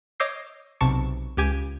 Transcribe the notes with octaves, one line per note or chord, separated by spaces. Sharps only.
C#5 D#5 D6 E6 G6 C7
B1 C3 A5 C#6
C#2 G4 G#5